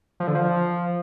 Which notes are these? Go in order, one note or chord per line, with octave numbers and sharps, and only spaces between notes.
F3
D3
F3